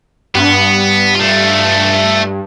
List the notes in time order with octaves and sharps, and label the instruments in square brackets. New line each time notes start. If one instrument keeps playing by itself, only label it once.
[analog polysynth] G2 [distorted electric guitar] B3
[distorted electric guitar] A3 F4